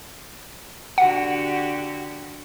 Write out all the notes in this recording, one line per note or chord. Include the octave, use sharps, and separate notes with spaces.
D3 F#4 G4 F#5